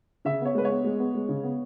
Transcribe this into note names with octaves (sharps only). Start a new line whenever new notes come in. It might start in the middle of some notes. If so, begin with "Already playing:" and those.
C#3 E5
B3 C#5
G#3 B4
C#5
B3
G#3
B3
G#3
C#3
B3